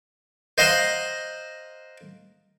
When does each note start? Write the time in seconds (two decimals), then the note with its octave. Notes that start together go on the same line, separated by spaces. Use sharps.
0.58 C5 D#5 F5 F#5 A#5 C6